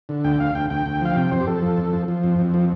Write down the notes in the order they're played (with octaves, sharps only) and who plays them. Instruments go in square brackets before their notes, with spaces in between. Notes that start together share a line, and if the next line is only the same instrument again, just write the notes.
[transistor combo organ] D3
D2 G5
D2 F5
D2 G5
D2 G5
D2
F3 F5
C3 G5
F2 C5
G4
F2 A4
F3
F2
F3
F3
F2
F2
F3